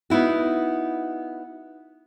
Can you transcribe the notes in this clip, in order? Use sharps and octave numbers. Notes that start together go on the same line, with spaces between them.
B3 D#4 E4 F#4